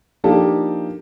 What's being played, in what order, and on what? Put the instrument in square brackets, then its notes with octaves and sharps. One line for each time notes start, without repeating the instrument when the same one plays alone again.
[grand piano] F3 A#3 D4 D#4 G4 A4